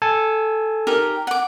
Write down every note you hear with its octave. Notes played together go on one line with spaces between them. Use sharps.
A4 G#5 A5
D#4 G4 A#4
F#5 D6